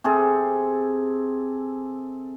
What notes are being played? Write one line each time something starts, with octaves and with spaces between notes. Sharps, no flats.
C3 C4 G#4 A4